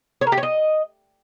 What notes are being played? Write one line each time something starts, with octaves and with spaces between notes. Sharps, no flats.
C#5
A#4
G4
C#5
D#5